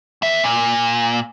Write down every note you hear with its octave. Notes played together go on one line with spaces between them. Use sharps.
E2 E5
A#2